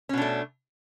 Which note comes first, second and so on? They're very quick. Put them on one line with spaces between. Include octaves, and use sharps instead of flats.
C#4 B2 D4 A3